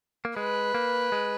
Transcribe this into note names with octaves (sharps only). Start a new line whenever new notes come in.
A#3
G#3 B4
A#3
G#3